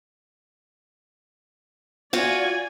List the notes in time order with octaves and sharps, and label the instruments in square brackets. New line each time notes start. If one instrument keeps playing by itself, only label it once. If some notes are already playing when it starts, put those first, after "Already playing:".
[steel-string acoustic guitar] F4 F#4 [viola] D5 G#5